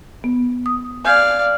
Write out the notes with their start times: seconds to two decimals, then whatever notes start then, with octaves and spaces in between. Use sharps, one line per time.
0.24 B3
0.66 D#6
1.04 D5 F5 G#5 G6 G#6